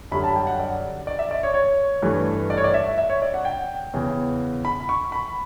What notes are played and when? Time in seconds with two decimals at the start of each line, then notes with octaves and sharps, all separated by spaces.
0.12 F#2 D3 G3 B5
0.24 A5
0.36 G5
0.47 F#5
0.60 D5
1.07 D5
1.19 E5
1.31 D5
1.43 C#5
1.54 C#5
2.02 G2 E3 A3
2.50 D5
2.57 C#5
2.64 D5
2.74 E5
2.98 E5
3.10 C#5
3.22 D5
3.34 F#5
3.45 G5
3.93 E2 C#3 E3
4.65 B5
4.89 C#6
5.12 B5